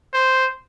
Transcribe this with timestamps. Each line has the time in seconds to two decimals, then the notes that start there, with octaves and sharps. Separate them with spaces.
0.14 C5